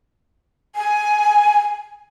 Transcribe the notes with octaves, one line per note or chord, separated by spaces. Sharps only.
G#5